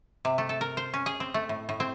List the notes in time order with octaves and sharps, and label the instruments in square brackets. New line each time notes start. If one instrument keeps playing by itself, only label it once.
[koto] C3
A3
A4
A#4
C5
C#4
G#4
C4
A3
A2
A2
C4